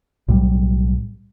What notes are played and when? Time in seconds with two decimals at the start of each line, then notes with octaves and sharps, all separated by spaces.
0.28 B1 A2 F#3 G3